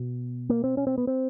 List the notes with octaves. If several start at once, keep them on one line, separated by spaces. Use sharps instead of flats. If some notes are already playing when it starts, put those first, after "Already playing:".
Already playing: B2
A#3
C4
C#4
C4
B3
C4